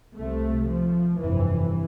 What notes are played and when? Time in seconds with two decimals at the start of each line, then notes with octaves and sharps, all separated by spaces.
0.16 C2 C3 A3
0.68 F3
1.19 G1 F2 C3 E3